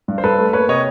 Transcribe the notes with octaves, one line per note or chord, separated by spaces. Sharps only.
G2
C5
G2 A4 B4
A3
A#3 B4 C#5
C3 C#5 D#5